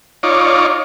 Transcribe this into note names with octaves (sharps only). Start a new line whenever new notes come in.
D#4 F4 C#5 D5